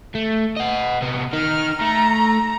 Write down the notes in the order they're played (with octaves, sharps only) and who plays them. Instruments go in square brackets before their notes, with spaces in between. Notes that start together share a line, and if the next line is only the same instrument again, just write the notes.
[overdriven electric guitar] A3
D#5 F#5
C3 B3
[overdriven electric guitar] D#4 A#4 [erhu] F6
[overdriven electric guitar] A3 [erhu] A#5